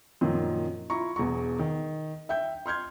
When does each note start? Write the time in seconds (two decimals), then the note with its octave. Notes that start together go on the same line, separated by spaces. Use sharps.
0.21 F#2 A#2 D#3 F3
0.90 E4 F4 A#5 C#6
1.16 E1 E2 G#4 A#5 C#6
1.59 D#3
2.29 E5 G5 G6
2.66 C6 F6 G6 G#6